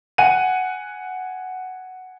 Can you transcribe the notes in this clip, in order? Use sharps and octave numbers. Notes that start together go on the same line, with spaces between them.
F#5 G#5 D#7